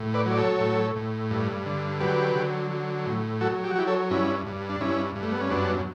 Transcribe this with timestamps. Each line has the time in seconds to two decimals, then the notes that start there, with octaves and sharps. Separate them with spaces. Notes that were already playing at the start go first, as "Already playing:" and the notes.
Already playing: A2
0.14 B4 D5
0.26 F#3
0.31 D5
0.38 A4 C#5
0.60 A2
0.96 A2
1.31 G2
1.66 D3
2.00 F#3 G4 B4
2.36 D3
2.71 F#3
3.06 A2
3.41 F#3 F#4 A4
3.64 G4
3.71 F#4
3.75 F#3 E4 G4
3.87 A4 C#5
4.11 G2 C#4 E4
4.46 G2
4.69 D4
4.81 G2 C#4 E4
5.16 G2
5.23 A3
5.32 B3
5.41 C#4
5.50 F#2 B3 D4